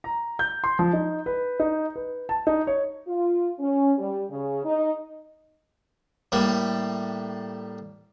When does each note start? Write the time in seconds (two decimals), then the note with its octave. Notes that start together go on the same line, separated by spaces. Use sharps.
0.04 A#5
0.39 G6
0.64 C6
0.79 F3
0.93 D#4
1.26 B4
1.60 D#4
1.96 B4
2.29 A5
2.47 D#4
2.67 C#5
3.07 F4
3.60 C#4
3.98 G3
4.30 C#3
4.65 D#4
6.32 A2 G3 A#3